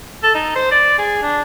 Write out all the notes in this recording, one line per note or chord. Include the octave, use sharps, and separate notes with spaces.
A4
D#4
C5
D5
G#4
D4